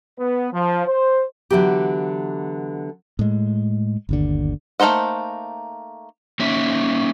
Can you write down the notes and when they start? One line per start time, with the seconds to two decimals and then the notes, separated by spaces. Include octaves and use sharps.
0.19 B3
0.53 F3
0.86 C5
1.50 D3 E3 F#3 B3 G4
3.19 A2 G#3
4.09 G1 D#2 D3
4.80 A3 A#3 D#4 C5 F#5
6.40 A#3 C#4 D#4 C#5 E5